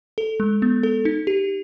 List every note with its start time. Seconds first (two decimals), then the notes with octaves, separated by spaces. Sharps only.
0.18 A4
0.40 G#3
0.62 B3
0.83 A4
1.05 D#4
1.27 G4